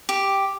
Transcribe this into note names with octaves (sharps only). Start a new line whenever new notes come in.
G4